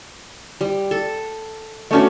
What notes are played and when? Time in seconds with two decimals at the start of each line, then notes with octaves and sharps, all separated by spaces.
0.61 G3
0.91 A4
1.91 A3 B3 C#4 D4 F#4